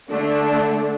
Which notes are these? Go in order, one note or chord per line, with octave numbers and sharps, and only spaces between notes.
D3 A3 D4